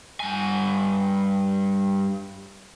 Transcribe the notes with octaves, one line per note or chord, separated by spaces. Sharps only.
G2 G#5